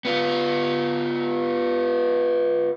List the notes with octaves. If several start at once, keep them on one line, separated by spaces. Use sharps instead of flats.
B3 F4